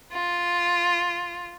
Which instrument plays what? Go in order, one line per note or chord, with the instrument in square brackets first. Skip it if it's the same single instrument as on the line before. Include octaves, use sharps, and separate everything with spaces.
[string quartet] F4